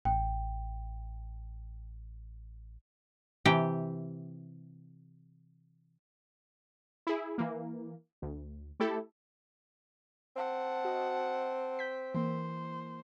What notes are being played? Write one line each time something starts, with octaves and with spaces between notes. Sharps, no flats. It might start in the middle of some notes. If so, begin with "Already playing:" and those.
A1 G5
C3 E3 G4 G5
E4 G#4
E3 A#3
D2
A3 E4 G4 A4
C4 F#5 A5
F#4 D#5
G6 B6
E3 A#3 C5